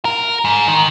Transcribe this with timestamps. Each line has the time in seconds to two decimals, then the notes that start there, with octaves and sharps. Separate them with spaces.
0.05 A#4
0.45 G#2
0.68 D#3